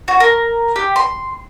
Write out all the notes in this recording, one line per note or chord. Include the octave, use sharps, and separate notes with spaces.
F#4
A#4
G4
C6